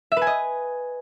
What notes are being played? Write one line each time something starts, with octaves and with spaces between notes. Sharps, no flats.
E5
B4
G#5
D#5